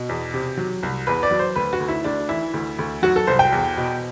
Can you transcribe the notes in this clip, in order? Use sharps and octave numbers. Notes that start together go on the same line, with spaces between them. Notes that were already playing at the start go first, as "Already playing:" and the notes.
Already playing: B2
E2
C3
F#3
C2
E2 B4
D5
F#3
C5
D2 B4
F#4
D2
E4
D2 D4
E3 E4
D2
D2
F#3 F#4
A4
C2 C5
G5
E2
B2